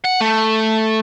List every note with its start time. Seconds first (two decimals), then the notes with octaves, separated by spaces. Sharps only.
0.05 F#5
0.21 A3